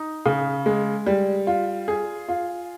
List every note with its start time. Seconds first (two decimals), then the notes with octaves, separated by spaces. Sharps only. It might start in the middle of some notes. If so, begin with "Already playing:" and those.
Already playing: D#4
0.26 C#3
0.66 G#3
1.07 G3
1.47 F4
1.88 G#4
2.28 F4